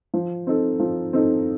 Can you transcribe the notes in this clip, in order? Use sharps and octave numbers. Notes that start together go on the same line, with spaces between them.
F3
C4 D#4 A4
F3
C4 D#4 A4